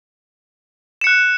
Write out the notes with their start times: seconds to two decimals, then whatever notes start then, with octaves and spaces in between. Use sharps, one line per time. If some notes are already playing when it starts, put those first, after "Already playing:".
1.01 E7
1.04 C#7
1.07 F#6